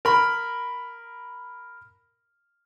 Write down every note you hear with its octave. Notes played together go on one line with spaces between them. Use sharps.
A#4 B5